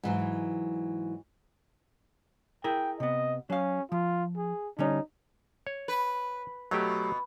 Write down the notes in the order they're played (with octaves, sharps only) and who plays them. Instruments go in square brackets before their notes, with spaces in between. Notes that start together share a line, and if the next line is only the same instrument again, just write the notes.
[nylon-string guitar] G#2 E3 F#3
[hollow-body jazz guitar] E4 G#4 A#4 [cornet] G5
[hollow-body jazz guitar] C3 B3 [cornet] D#5
[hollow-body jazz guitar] F#3 F5 [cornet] C#4
[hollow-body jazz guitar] F3 [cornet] F4
[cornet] G#4
[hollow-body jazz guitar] D3 G3 C#4 [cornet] D#4
[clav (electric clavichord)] C#5
[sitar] B4
[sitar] B2 [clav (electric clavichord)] F#3 A3 G4